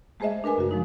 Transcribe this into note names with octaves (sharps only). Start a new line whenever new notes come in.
G#3 A3 G#4 C5 D#5 E5
D4 A#4 B4 G#5
F#2 C#3 F#4
F3 G#3 D#4